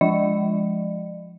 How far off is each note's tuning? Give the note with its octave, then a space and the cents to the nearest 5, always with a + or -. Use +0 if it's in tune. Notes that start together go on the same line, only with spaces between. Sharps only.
F3 +0 G#3 +0 D5 +40